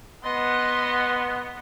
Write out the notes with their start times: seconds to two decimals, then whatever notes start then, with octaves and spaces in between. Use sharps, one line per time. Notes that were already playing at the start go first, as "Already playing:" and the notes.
0.24 B3 D#5 C6